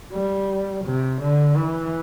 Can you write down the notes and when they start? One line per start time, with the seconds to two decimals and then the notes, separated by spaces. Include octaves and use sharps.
0.12 G3
0.85 C3
1.21 D3
1.57 E3